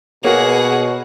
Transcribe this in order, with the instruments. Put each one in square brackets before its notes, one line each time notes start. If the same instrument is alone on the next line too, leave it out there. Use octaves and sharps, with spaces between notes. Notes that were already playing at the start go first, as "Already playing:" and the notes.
[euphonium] B2 [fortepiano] A#3 [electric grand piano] F#4 C#5 [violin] G#4 F#5